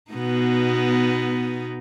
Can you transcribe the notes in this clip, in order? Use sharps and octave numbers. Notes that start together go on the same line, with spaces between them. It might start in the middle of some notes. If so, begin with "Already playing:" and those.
B2 B3 D#4